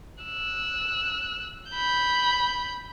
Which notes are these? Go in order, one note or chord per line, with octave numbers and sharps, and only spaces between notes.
E6 F#6
B5 G6